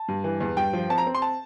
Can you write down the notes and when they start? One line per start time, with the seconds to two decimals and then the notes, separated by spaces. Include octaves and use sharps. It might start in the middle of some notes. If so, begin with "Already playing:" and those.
Already playing: A5
0.08 G2
0.24 E3
0.40 E2
0.57 G2 G5
0.73 F3
0.90 C4 A5
0.98 A#5
1.07 C4
1.15 C6
1.22 A5